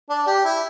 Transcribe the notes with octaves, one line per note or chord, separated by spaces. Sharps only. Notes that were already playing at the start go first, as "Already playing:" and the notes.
D4
G4
E4